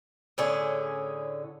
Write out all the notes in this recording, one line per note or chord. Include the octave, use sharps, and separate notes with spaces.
A2 D3 C#4 G#4